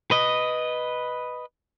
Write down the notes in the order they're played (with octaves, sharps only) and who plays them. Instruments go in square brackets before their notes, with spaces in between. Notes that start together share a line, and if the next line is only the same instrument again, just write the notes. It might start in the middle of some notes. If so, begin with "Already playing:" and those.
[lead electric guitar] B4 D#5